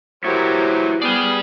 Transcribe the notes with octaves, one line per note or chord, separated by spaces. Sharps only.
E3 F#3 E4 G4 A#4 C5 C#5
B3 G#4 D5 G5 F6